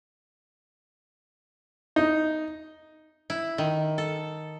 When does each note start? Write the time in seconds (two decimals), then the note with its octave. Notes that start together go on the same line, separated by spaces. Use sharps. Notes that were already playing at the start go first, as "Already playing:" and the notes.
1.96 D#4
3.30 E4
3.58 D#3
3.98 A4